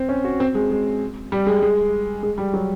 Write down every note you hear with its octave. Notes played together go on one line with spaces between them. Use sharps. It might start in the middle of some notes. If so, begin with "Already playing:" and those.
Already playing: C4
C#4
F#4
C4
G#3
G#3
G3
G#3
G#3
G#3
G3
F#3